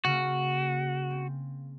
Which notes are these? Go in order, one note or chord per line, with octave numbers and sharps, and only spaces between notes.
C#3 A#3 F#4
C4